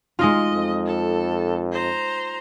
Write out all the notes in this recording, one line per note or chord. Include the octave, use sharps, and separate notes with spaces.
G#3 D#4 F4 D#5
F2
A4
C5 A#5